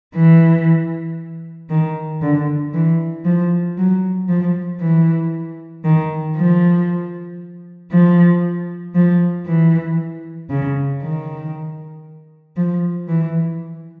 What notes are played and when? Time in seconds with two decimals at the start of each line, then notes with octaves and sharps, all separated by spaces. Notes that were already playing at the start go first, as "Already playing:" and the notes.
0.15 E3
1.70 D#3
2.22 D3
2.74 E3
3.25 F3
3.78 F#3
4.29 F3
4.81 E3
5.85 D#3
6.36 F3
7.91 F3
8.95 F3
9.46 E3
10.50 C#3
11.02 D#3
12.57 F3
13.08 E3